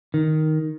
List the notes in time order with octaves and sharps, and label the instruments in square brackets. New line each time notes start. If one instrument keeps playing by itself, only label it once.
[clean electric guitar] D#3